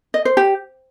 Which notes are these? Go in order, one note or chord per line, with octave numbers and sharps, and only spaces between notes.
D#5
C5
G4